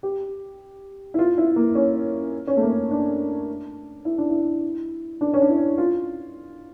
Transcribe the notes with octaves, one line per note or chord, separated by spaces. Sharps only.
G4
E4
F4
E4
A#3
C#4
C#4
A3
A#3
D4
E4
D4
E4
D4
C#4
D4
E4
F4